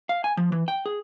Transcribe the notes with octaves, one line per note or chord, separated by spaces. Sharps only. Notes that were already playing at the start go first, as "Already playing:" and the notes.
F5
G#5
F3
E3
G5
G#4